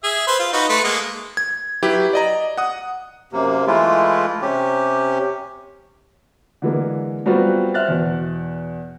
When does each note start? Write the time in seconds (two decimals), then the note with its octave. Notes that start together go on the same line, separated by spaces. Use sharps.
0.04 G#4 E5
0.27 B4 C5
0.39 F4
0.53 D#4 F#4 B4
0.69 A3 B4 C6
0.84 G#3 A#3 D#6
1.37 G#6
1.83 F#3 E4 G4 B4
2.13 D5 D#5 A#5
2.58 F#5 D#6
3.33 F#2 C3 A#3
3.67 E3 G#3 A3 E4 F4
4.42 C3 C#4 G4
6.62 D3 E3 G#3 A#3
7.26 F#3 G3 B3 C4 F4 F#4
7.74 C5 E5 F6 F#6 A6
7.88 E2 B2